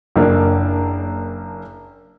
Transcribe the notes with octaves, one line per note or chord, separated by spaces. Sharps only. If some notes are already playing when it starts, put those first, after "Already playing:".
F#1 A#3 D4